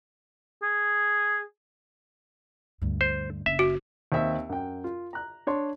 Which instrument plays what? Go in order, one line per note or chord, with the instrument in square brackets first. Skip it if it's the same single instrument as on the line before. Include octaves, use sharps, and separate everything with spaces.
[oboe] G#4
[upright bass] D2 G2
[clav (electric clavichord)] C5
[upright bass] F#1 D4 [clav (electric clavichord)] E5
[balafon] F#4
[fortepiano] D#2 C4 E5 E6
F#2 G5
F4
A#5 F#6
D4 C#5 C6